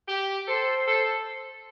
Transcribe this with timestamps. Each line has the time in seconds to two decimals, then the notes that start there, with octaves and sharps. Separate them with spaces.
0.08 G4
0.47 A4 C5
0.87 A4